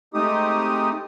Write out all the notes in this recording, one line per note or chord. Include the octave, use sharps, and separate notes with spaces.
G#3 A3 C4 D#4 G4 D#6